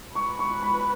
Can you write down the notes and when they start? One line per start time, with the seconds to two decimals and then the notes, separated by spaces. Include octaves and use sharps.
0.15 B4 C#6
0.39 C#6
0.63 B5